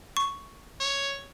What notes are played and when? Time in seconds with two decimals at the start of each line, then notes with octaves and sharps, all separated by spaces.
0.17 C#6
0.80 C#5